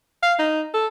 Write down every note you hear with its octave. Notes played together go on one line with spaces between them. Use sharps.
F5
D#4
A4